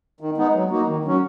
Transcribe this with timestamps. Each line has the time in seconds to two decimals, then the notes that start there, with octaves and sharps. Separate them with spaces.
0.20 D#3
0.37 G#3 B3 D#4
0.54 F#3
0.71 A#3 D#4 F#4
0.87 D#3
1.05 F#3 C#4 F#4